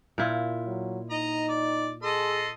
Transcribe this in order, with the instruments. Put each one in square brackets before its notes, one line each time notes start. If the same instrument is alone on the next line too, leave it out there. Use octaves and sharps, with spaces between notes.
[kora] A#2 E4 F4
[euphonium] F#3
[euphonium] D#4 [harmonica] D#5 A#5
[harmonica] D5
[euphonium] G#4 [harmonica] A4 D#5 C6